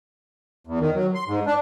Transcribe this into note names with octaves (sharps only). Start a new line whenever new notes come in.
E2
D#3
F#3
C6
G#2
D4